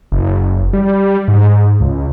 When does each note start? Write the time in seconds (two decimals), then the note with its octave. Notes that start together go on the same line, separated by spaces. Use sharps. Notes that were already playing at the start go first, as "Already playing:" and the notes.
0.12 F#1
0.73 G3
1.28 G#2
1.80 C#2